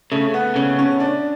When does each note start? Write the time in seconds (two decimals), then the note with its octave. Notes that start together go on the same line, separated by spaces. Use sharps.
0.12 C#3 A3
0.34 B3
0.56 C#3 C#4
0.79 C#4
1.00 D4